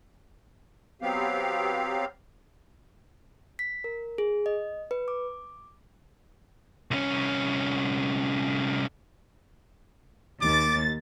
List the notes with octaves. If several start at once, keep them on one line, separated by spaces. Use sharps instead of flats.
F#3 B3 C4 G4 F5
B6
A#4
G#4
D#5
B4
D6
C2 C#4
D#2 D6 A6